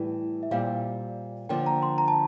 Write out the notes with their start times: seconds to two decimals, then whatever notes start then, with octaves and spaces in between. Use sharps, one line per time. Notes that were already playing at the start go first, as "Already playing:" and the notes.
Already playing: A2 E3 G3
0.43 E5
0.51 A#2 G3 C4 F5
1.49 D3 F3 A#3 G5
1.66 A#5
1.83 C6
1.98 A#5
2.08 A5